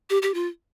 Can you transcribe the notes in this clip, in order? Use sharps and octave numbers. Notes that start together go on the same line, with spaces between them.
G4
G4
F4